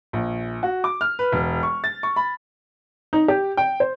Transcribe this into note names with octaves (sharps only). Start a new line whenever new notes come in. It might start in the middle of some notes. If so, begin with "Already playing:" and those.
A#1
F#4
D6
F6
B4
E1
C#6
A6
C#6
B5
D#4
G4
G5
C5